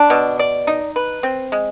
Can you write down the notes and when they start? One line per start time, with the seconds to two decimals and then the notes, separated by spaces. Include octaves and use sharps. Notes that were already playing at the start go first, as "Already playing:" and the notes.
Already playing: D4
0.10 B2
0.39 D5
0.67 D#4
0.96 B4
1.23 C4
1.52 G#3